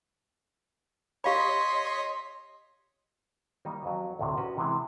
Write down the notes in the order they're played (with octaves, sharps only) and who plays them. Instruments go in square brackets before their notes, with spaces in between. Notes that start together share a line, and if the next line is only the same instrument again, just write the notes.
[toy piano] G4 F5 B5 [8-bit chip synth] C#5 D#5 B6 [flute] C6
[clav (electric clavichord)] D#3 G3 A#3 D#4
F2 F#3
D2 A2 C3
C#4 F#4 G4 B4
C3 E3 G#3 B3 G#4